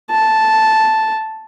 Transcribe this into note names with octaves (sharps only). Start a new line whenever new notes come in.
A5